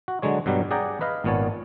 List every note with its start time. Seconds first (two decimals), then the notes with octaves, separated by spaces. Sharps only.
0.08 F#4
0.22 D3 F#3 G#3 C#5
0.46 G2 B2 F#3 G3
0.71 G#4 D5 F#5 G5 A#5
1.01 B4 D#5 F5
1.24 G#1 A#2 B3 C#5 A5